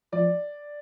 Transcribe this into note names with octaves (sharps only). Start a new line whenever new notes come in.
F3 D5